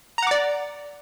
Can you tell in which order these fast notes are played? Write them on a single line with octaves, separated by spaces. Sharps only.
A#5 F#5 D6 D5